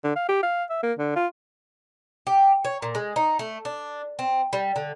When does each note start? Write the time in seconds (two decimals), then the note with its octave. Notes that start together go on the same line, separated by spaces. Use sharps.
0.04 D3
0.16 F5
0.29 G4
0.43 F5
0.70 E5
0.83 A#3
0.98 D3
1.16 F4
2.27 G4
2.65 C#5
2.82 A#2
2.95 G#3
3.16 D#4
3.39 A3
3.65 D4
4.19 C4
4.53 G3
4.76 D3